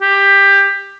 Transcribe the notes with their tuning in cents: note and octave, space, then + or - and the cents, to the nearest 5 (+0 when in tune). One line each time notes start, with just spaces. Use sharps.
G4 +15